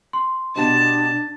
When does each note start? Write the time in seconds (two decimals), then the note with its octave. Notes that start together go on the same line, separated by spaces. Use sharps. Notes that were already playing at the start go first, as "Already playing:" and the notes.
0.13 C6
0.56 B2 D4 G4 D#5 A5